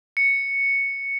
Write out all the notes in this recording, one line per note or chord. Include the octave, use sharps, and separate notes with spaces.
C#7